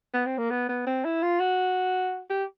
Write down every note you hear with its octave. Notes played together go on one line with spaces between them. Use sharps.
B3
C4
A#3
B3
B3
C4
E4
F4
F#4
G4